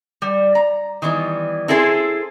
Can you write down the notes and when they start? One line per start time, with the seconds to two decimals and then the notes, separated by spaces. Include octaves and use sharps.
0.22 G3
0.55 A#5
1.02 D#3 E3 G3 B3
1.68 C4 E4 G#4 A4 B4 C5